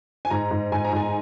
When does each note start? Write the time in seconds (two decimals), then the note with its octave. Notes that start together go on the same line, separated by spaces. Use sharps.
0.25 G#5
0.30 G#2 A#5
0.51 G#2
0.72 G#2 G#5
0.85 A#5
0.93 G#2 G#5